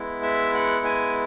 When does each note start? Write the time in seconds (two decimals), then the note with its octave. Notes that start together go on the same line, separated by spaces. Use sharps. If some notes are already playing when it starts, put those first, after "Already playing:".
Already playing: G#3 B3 E4
0.23 E5
0.55 F#5
0.85 G#5